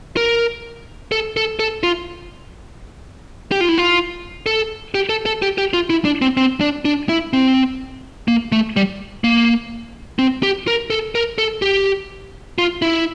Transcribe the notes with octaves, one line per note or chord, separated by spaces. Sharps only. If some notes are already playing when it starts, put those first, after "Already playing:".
A#4
A4
A4
A4
F4
G4
F4
E4
F4
A4
G4
A4
A4
G4
G4
F4
E4
D4
C4
C4
D4
D4
E4
C4
A#3
A3
G3
A#3
C4
G4
A#4
A4
A#4
A4
G4
F4
E4